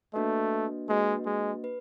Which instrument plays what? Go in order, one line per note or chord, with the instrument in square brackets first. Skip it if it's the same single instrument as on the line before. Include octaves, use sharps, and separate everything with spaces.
[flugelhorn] A3 [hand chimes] A#3 D4 F#4 B4 D#5
[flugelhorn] G#3 [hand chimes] A#3 D4 F#4 B4 D#5
[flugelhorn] G#3
[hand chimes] B4